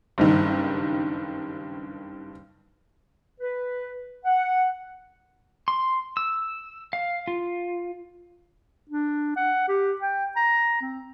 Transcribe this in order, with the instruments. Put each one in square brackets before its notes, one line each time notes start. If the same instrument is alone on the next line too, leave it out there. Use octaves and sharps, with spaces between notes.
[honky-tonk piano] F#1 G2 D#3
[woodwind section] B4
F#5
[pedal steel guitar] C6
E6
F5
F4
[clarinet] D4
F#5
G4
G5
A#5
C4